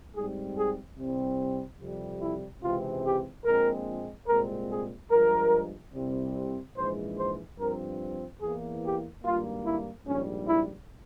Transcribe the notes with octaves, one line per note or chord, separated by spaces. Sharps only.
G#2 G3 C4 G#4
G#4
C2 C3 G3 C4
F2 C3 G3
E4
C#2 C3 E3 G#3 C4 F4
G4
A#1 A#2 G#3 C4 A#4
C2 A#2 G#3 C4 A#4
G#4
G2 F3 G#3 A#4
C2 C3 G3 C4
A#1 G#2 E3 G#3 C5
C5
G2 F3 C4 A#4
E2 E3 A#3 G#4
G4
G#1 G2 G3 A#3 F4
E4
A#1 G#2 G3 C#4
E4